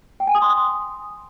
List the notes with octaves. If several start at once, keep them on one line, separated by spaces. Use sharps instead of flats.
G5
G#5
D#6
C6
D#6